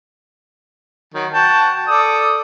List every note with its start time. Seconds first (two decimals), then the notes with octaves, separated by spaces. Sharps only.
1.14 D#3 F#3
1.33 F#4 G5 A5
1.88 A4 D5 D#6